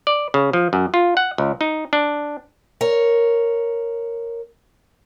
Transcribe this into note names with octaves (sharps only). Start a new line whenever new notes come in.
D5
C#3
F3
F#2
F4
F#5
C#2
D#4
D4
A#4 C#5